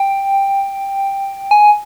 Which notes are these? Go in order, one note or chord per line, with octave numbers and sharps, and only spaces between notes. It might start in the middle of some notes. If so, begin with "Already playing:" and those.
Already playing: G5
G#5